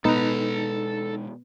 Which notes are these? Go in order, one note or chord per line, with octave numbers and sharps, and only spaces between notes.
B2 G#3 B3 D#4 A4 B4 A#5